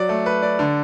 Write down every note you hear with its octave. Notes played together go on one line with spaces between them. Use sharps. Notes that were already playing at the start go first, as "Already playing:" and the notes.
Already playing: F#3 D5
A3
B4
D5
D3